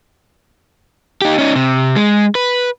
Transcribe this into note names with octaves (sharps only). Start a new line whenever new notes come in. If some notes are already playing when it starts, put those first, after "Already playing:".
D#4 G4
C#4 D#4
C3
G#3
B4